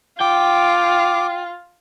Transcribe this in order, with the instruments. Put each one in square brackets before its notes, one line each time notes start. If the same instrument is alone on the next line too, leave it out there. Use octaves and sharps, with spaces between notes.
[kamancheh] F4 [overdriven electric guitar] G5 [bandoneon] D6